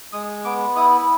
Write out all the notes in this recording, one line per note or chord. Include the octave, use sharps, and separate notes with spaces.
G#3 D#6
B3 D6
E4 D#6